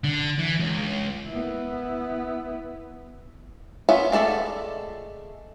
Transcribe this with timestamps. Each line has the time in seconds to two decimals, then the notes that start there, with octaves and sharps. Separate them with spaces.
0.04 D3
0.39 E3
0.60 C#2
1.28 B3 E4
3.89 B3 C#4 F4 E5 F#5
4.12 G#3 A3 A4 D5 E5